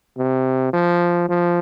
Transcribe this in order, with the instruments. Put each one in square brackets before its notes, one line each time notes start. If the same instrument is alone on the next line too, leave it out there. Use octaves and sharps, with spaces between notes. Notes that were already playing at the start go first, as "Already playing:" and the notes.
[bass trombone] C3
F3
F3